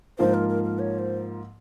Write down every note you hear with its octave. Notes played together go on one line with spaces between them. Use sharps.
G#2 F3 A#3 C5
A#4
A#4
A#4
C#5
C5